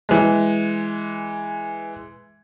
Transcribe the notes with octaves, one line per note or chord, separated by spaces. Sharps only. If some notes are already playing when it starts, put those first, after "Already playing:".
E3 G#3